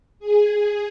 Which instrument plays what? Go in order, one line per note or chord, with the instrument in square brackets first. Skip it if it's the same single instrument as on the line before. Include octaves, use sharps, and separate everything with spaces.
[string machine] G#4